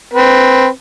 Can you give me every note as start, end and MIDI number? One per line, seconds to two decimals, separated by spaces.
0.13 0.67 60
0.13 0.67 71